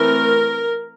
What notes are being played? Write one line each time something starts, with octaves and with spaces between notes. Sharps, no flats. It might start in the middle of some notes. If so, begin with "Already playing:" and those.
Already playing: E3 A3 C4 A#4